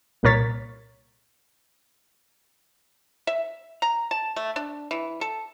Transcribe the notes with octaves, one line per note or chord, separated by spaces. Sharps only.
C2 A#2 A#4 C#5 A6 B6
E5
A#5
A5
A3
D4
E3
A4